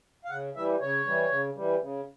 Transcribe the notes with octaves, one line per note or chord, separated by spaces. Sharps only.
F5
C#3 F#5
E3 G3 E5
C#3 C#5
E3 G3
C#3
E3 G3
C#3